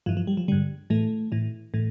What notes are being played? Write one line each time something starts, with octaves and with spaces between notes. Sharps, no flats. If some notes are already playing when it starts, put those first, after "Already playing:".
G2 E3 F3
F3
G3
F3
G2 D3 G3
A2 E3 A3
A2 E3
A2 E3